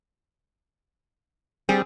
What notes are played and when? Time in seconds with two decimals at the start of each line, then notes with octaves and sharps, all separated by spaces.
1.69 G3 C4 G#4